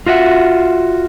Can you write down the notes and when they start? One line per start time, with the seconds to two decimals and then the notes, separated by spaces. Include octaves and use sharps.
0.06 F4 F#4 E5 F#5